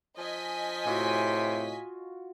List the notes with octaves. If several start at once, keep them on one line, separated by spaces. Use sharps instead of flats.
F3 D#5 G#5 B6
A2 C3 F4 F#4